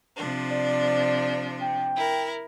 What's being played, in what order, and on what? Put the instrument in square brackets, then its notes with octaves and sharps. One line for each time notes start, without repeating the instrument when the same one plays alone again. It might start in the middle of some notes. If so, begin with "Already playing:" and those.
[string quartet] C3 F3 D4
[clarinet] D5
G5
[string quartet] E4 A#4